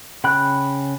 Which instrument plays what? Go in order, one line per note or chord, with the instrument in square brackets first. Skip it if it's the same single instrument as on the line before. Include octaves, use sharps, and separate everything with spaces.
[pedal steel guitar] C#3 G5 B5 F#6